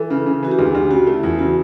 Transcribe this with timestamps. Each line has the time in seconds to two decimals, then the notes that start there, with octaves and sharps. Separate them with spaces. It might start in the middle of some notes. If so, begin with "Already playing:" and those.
Already playing: E3 A4
0.10 C#3
0.26 C#3
0.43 E3 F#4
0.51 G4
0.58 D2 G#4
0.75 D2 G4
0.91 C#3 F#4
1.07 A3 E4
1.23 E2 F4
1.39 C#3 F#4